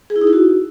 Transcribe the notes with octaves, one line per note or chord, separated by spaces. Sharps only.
G#4
E4
D#4
E4
F#4